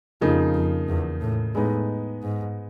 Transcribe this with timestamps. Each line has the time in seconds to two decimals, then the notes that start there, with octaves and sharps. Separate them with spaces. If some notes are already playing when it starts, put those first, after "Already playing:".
0.21 F2 C#3 F3 A#3 D#4
0.55 F2
0.89 E2
1.22 A2
1.55 A2 G#3 B3 D#4
2.23 G#2